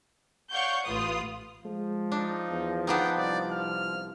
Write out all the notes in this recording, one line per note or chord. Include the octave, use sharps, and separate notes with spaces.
C#5 D5 F5 F#5 C#6 G6
A1 F4 B4 D#6
F3 G#3
D4 D#4
E2
B3 D4 D#4 G5
C2 D5
F6